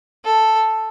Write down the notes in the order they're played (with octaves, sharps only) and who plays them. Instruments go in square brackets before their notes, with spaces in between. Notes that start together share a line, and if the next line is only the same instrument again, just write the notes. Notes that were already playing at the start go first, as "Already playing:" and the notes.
[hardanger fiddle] A4